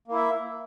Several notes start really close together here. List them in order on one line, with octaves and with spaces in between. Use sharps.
A#3 E4 E5